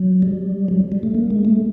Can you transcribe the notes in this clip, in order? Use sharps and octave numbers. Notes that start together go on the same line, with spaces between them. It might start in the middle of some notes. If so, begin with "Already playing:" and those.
Already playing: F#3
G3
F#3
G3
A3
A#3
G#3
A3